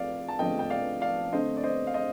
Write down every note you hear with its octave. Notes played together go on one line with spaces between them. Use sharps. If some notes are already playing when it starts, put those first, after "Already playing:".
Already playing: F3 A3 C4 D5 F5
A5
D3 F3 A3 C4 D#5 G5
G5
D5 F5
D5 F5
D3 A3 C4 C5 D#5
D5
C5 D#5
F5
C5 D#5